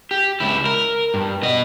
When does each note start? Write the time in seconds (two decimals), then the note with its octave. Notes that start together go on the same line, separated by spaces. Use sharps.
0.11 G4
0.40 C#2 E4
0.66 A#4
1.14 G2
1.42 B2 D#5